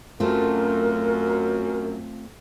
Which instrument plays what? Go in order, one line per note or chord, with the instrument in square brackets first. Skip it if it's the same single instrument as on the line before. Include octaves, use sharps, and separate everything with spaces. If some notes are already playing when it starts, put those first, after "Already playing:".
[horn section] F#2 [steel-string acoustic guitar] A3 C4 F4 [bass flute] A#4